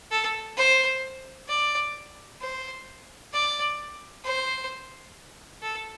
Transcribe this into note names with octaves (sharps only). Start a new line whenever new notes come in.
A4
C5
D5
C5
D5
C5
A4